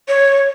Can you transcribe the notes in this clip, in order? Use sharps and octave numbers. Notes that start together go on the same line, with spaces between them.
C#5